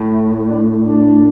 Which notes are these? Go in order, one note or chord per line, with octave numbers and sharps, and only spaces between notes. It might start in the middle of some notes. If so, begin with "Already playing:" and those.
Already playing: A2
E4
D4
D4